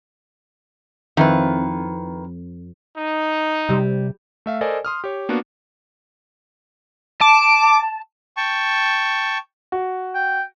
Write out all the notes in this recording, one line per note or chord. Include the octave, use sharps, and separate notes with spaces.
F2 D#3 E4 B4
D#4
C3 G3
A3 E5 F5
A4 A#4 C5 D5 D#5 G#5
C6 D#6 F6
G4 C#5
A#3 B3 D4 F#4
A5 D6
G5 A5 C#6
F#4
G5